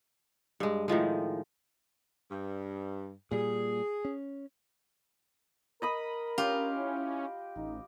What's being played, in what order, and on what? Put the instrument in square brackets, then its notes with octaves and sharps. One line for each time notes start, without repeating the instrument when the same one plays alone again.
[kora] G2 G#3
A2 D#3 F3 G#3
[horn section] G2
[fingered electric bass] A#2 G3 [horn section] G#4
[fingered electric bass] C#4
[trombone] A#4 [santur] D#5 B5 D#6
[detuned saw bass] C#4 [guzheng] F4 [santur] G4
[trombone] E4
[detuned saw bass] A1 [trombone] D#4